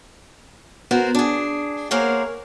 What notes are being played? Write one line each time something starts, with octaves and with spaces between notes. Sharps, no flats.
B3 F#4 A#4 C5
D4 G#4
A#3 G#4 A#4 C5 C#5 F#5